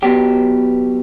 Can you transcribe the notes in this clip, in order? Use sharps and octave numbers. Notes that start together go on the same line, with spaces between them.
B1 B2 F#3 G4